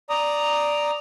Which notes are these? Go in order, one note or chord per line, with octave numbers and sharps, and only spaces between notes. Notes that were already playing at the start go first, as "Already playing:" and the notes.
D5 A#5 D#6